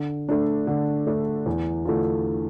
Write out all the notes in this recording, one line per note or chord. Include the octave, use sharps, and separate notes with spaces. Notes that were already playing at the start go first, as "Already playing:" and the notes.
Already playing: D3
A3 D4
D3
A3 D4
E2
D3 A3 D4 F4